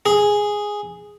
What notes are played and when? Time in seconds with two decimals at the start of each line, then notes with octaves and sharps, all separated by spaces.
0.06 G#4